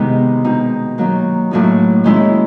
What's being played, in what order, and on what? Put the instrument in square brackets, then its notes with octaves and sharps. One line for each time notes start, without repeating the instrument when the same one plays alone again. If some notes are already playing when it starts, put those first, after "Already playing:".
Already playing: [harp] C3 D#3 G#3 B3 D#4
B2 G#3 C4 D#4
D#3 F#3 A#3
A2 F#3 A#3 D#4
D#3 G#3 C#4 E4